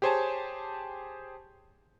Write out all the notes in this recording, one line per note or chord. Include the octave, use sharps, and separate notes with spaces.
G4 G#4 C5 C#5 G#5 A5